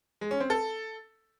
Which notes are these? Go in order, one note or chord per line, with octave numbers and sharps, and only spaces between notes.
G#3
C#4
C4
A4